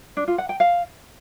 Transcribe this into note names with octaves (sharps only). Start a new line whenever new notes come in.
D4
F4
F#5
G5
F5